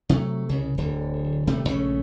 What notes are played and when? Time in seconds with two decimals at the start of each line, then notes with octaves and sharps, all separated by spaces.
0.09 C3 F#3 G3 A3
0.49 C2 C#3
0.78 D1 D3
1.47 D#1 C3 G3 A3
1.69 A#1 C#3 A3 C#4